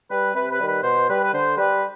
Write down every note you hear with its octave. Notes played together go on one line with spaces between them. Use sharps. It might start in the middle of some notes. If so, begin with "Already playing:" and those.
G3 B4
C3 B4
B4
D#3 G3
B4
B2 C5
G3 B4
B4
D3 C5
G3 B4